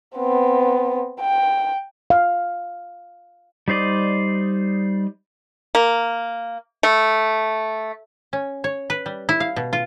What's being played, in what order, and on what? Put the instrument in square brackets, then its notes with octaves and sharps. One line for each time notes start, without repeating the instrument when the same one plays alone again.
[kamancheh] B3 C4
G5
[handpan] F5
[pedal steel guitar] G3 D#4 C5 D5 D#5
[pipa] A#3
A3
[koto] C#4
C#5
B4
G3
E4
F5
B2
F4